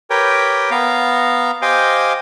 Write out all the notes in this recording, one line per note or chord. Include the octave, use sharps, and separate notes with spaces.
G4 A#4 B4 C#5 G5
B3 F5 A#5
G4 C5 D#5 F5 G5 G#5